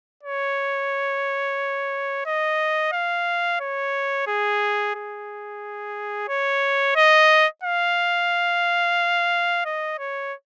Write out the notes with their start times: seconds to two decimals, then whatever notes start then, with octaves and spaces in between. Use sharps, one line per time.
0.23 C#5
2.26 D#5
2.93 F5
3.60 C#5
4.27 G#4
4.95 G#4
6.29 C#5
6.96 D#5
7.63 F5
9.65 D#5
9.99 C#5